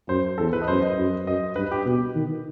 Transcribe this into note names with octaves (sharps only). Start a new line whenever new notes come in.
F#2 C5
E2 A4
B4
D#5
F#2 C5
D#5
F#2
F#2 D#5
G2 B4
G4
B2
D#3